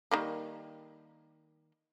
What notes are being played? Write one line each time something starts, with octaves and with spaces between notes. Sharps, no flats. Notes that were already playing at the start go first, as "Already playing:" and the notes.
D#3 G3 A#3